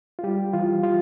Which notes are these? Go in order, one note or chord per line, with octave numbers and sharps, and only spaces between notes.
F4
G3 G4
E3 F4
F4